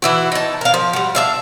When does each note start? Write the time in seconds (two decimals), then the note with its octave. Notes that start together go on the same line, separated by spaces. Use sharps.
0.02 E3 E4 F#4
0.32 D#4 A5
0.61 A#4 F5
0.74 F3
0.93 G3 F#4
1.15 D4 E5 F5